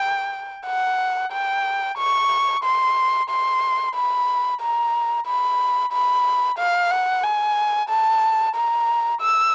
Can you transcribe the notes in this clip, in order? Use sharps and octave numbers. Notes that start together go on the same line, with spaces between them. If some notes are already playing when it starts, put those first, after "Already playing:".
Already playing: G5
F#5
G5
C#6
C6
C6
B5
A#5
B5
B5
F5
F#5
G#5
A5
A#5
E6